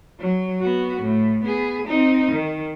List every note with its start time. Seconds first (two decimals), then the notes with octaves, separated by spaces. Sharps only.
0.20 F#3
0.61 B3 F#4
1.01 A2
1.44 B3 G#4
1.87 C4 D#4
2.31 D#3